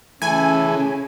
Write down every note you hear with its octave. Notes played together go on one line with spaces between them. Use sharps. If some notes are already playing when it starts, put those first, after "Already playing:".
C#3 E3 A3 G#5